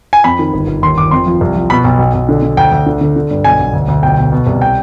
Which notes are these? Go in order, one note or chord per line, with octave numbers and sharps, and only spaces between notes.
G#5
F2 B5
D#3
G1
G1
D#2 C6
D#2 D6
F2 C6
F3
C2
F3
B2 B5
B1
B1
B1
D3
D3
D2 G5
D2
D3
D3
D3
G2
B1 G#5
B1
D2
D2
B1 G5
B2
B2
C2
G5